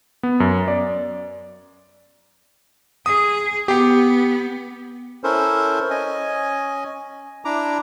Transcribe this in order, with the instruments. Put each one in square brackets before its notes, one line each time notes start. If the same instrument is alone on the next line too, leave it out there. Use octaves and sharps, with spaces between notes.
[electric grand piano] B3
F#2
D5
[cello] G#4 [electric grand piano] D#6
[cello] B3 [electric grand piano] G4 G5
[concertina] C#4 E4 A4 A#4 C5
C#4 D#5 G#5
D4 E4 A#5 D6